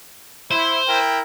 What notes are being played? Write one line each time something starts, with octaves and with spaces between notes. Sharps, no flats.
E4 C5
E4 A#4 G5